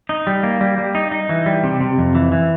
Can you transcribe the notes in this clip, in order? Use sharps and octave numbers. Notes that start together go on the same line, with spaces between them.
D#4
G3
A#3
G3
G3
D#4
D#4
E3
G3
C3
C3
F2
E3
E3